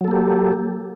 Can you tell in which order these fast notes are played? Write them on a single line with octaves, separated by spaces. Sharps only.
F#3 A4 A#3 G4